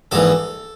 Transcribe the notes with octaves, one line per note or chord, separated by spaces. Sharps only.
A#1 G#2 E3 A4